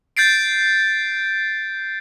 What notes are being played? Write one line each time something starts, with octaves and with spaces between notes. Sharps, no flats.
G6 A6 C7 D7